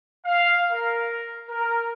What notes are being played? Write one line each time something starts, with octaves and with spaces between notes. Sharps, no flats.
F5
A#4
A#4